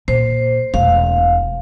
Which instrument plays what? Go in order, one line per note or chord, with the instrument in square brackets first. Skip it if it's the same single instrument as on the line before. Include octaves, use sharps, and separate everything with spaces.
[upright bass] A#2 [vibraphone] C5
[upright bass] E1 A3 [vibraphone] F5